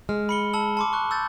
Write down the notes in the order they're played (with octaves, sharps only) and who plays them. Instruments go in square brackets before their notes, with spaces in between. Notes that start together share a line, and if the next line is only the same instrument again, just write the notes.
[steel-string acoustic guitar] G#3 [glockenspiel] F6
[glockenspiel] B5 C#7 G7
A5 E6 F#7
A5 C6 D6
C#6 F#6
E6 G6 A6